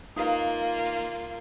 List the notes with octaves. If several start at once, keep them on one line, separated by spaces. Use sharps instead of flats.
A#3 D#4 F4 B4 F5